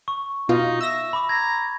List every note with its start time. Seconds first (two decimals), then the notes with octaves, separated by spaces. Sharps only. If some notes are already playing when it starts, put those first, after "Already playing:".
0.08 C#6
0.49 B2 D#4 F4
0.81 E5 E6 A#6
1.13 B5 D6
1.29 A#5 G#6